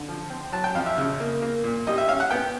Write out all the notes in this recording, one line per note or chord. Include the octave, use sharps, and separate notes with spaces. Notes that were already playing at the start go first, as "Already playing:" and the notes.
Already playing: D3
F3
C4
F#3 A5
G5
F2 F5
E5
C#3
A#3
A#3
A#2
G3 D#5
E5
C#4 F5
F#5
B3 G5